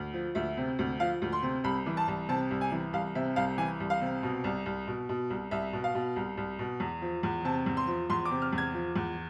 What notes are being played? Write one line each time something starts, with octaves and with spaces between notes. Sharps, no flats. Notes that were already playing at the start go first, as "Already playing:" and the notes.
Already playing: D2
F3
D2 E5
C3
D2
F3 F5
D2
C6
C3
C2 B5
E3
A5
C2
C3 A5
C2
G#5
E3
C2 F5
C3 E5
C2 F5
E3 G#5
C2
F5
C3
B2
C2
C2
B2
B2
C2
C2 E5
B2
F5
B2
C2
C2
B2
E2
F3
E2
C3 A5
E2
C6
F3
E2 C6
D6
C3
F6
E2
G#6
F3
E2